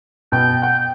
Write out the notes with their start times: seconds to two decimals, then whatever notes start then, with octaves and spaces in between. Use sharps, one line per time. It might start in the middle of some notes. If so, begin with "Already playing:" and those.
0.32 B2 G5 G6
0.62 F#5 G5